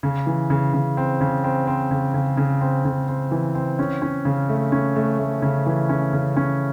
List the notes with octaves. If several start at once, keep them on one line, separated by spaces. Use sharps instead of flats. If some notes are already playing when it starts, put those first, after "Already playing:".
C#3
E3
C#3
C#3
C4
C#3
C4
C4
C#3
C#3
C#3
C4
C#3
C4
E3
C4
C#4
C#4
C#3
A3
C#4
A3
A3
C#3
E3
C#4
C#3
C#4